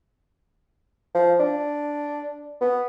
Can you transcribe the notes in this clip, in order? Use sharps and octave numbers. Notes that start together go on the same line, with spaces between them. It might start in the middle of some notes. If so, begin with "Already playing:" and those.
F3
D4
B3